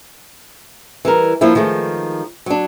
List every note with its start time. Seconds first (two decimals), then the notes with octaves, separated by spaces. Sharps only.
1.05 E3 G3 A#4
1.41 F3 A#3 D4 E4
1.55 D#3 F3 G#3 A3
2.46 F#3 D4